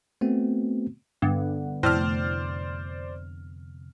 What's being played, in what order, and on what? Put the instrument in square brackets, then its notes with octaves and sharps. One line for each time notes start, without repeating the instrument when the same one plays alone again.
[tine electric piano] A3 B3 C4 F#4
[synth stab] G2 [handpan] D3 B3 [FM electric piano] F#5
[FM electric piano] F2 C3 [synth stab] A2 [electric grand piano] C5 D5 F6